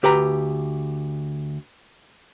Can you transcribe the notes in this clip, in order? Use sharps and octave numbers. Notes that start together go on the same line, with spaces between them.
D2 G4 B4 G5 A#5